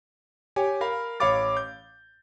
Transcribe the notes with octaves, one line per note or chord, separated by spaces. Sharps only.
G4 C#5 G5 G#5
A#4 F5 B5
A1 C#5 F5 B5 D6 A6
G6